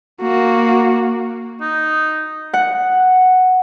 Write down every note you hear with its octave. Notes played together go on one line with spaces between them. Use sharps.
A#3 F#4
D#4
F#5